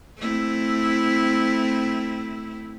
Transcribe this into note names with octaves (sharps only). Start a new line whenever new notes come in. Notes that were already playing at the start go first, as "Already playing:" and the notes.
A3 C4 E4